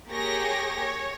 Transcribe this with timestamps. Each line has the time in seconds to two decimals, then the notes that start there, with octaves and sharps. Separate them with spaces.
0.10 A#3 G4 G#4 C#5 A#6
0.78 C#5